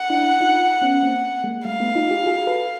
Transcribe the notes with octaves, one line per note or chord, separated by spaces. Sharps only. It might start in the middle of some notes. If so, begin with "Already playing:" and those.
Already playing: F#5
D4 E4
D#4 F4
B3 C#4
A#3 C4
G#3 A#3
G3 A3 F5
A3 B3
D#4 F4
F4 G4
F#4 G#4
A4 B4